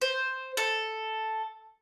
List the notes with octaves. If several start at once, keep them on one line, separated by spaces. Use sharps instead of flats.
C5
A4